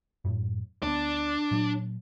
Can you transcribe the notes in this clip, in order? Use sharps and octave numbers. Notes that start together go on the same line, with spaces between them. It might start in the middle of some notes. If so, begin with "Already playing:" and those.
F#2 A2
D2 B3 D4
A#2 F#3